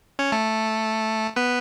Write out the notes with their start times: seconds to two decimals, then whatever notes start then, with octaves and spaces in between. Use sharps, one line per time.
0.19 C#4 C#5
0.32 A3 A4
1.36 B3 B4